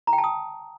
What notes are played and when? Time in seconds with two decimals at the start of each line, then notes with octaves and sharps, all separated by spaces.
0.07 A#5
0.13 G5
0.18 A5
0.24 D#6